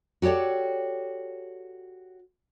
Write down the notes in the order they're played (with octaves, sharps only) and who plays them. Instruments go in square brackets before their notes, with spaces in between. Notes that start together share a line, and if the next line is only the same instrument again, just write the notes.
[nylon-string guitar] F#4 G4 A4 C#5 D5